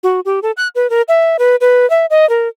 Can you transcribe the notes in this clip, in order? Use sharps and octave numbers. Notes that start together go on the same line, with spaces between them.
F#4
G4
A4
F#6
B4
A#4
E5
B4
B4
E5
D#5
A#4